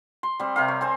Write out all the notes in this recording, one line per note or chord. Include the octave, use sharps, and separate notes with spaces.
C6
G3 C4
C3 A#4 F5
C#5
C4 C5 G#5